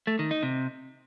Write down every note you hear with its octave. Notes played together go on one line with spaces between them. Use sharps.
A3
D#3
D#4
C3